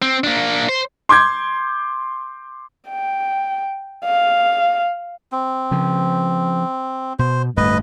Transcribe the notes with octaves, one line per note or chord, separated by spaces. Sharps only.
C4
A#3 D4
C5
C6 D6 G6 G#6
G5
F5
C4
C#3 F3
B2 C5
D1 G2 A3 B4 D#5